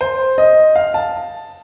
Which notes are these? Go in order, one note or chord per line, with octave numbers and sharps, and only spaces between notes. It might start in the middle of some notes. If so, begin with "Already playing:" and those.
C5
D#5
F5
A5